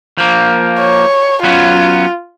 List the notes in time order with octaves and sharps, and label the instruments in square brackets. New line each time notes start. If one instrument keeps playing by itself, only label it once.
[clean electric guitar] F3 A#3
[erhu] C#5
[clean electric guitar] F#3 B3 C#4 [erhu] F4